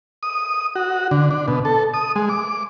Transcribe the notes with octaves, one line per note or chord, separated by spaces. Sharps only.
D#6
F#4
D3
D4
B2
A4
D#6
G#3
D6